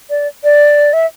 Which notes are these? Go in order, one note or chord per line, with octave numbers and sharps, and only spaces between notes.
D5
D5
E5